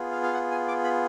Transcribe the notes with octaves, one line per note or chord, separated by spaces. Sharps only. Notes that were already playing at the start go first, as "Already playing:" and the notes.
Already playing: B3 F4 G#4
F5
F5
F#5
G#5
D6
B5